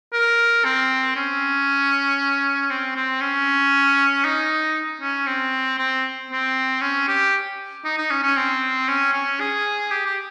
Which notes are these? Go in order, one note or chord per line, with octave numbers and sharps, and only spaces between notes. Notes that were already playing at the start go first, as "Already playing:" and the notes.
A#4
C4
C#4
C4
C4
C#4
D#4
C#4
C4
C4
C4
C#4
G4
D#4
D#4
C#4
C#4
C4
C#4
C#4
G#4
G4
G4